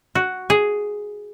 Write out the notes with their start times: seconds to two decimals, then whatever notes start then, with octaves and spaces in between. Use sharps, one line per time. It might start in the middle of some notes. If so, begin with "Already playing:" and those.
0.15 F#4
0.50 G#4